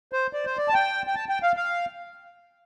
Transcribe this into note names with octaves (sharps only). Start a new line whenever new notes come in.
C5
D5
C5
D5
A5
G5
G5
A5
G5
F5
F5